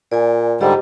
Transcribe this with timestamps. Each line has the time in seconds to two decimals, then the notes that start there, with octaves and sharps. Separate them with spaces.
0.12 A#2 D5 G#5
0.61 G#2 D3 G3 G4 C5 D#5